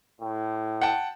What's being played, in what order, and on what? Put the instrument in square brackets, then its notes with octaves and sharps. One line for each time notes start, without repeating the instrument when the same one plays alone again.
[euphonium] A2
[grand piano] F#5 G5 A5